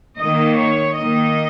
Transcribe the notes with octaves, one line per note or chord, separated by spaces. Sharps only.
D#3 A#3 D#5
C#5
D#3 A#3 D#5